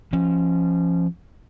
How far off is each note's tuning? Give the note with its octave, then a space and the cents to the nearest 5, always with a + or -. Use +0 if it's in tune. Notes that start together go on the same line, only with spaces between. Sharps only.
F3 -20 C#4 -15